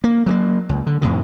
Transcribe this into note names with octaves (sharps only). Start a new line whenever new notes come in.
A#3
F#3 G#3 A#3
C#2
D3
F2 A2 C3 D#3